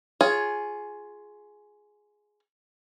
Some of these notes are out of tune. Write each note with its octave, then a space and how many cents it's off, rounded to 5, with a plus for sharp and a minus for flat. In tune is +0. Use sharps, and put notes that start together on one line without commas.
F4 +0 G#4 +10 C#5 +0